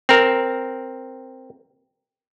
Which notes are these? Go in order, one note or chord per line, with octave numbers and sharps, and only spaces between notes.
C4 A#4